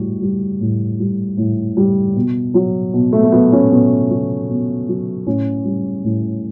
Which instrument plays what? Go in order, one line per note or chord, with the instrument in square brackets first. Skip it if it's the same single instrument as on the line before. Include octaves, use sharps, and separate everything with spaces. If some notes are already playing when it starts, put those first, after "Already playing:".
Already playing: [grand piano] A2 G3 F#4
G3
A2
G3
A2
G3
B2
F#3
B2
A3
A3
F#3 B3
C#4
B2 B3
F#3
B2
F#3
A2 C#4
G3
A2